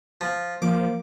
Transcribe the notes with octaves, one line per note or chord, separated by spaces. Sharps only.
F3
F3 A#3 D6